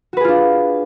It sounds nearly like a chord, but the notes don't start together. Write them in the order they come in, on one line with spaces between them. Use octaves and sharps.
F#4 B4 G#4 F4 D4